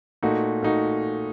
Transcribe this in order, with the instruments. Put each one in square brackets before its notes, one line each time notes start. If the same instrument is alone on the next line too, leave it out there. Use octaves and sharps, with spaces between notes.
[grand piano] A#2 A3 D#4 F#4
A#2 A3 D#4 F#4